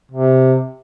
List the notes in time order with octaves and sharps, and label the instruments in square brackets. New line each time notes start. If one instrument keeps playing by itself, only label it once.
[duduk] C3